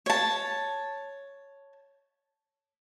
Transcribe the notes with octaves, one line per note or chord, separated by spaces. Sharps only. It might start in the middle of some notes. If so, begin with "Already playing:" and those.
C#5 A5